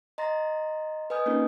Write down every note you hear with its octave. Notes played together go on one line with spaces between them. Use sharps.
D#5 A#5 C6 A6 A#6
B4 D#5 G#5 D#6 F6 G6
A#3 C4 C#4 D#4 F4 A#4